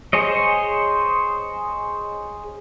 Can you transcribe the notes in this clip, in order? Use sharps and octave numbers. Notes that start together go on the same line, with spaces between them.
G#4 C5 C#5 D#5